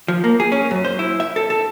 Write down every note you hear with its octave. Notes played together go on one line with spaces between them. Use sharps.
F3
A#3
G#4
C#4
F#2
C5
E4
E5
A4
A4